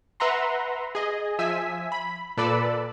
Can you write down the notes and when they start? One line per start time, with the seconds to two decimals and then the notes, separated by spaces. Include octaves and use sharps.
0.20 B4 E5 F#5 A#5 C6
0.95 G#4 D#5
1.39 F3 E5 G#5 E6 B6
1.92 B5
2.37 A#2 A4 B4 D5 B5 E6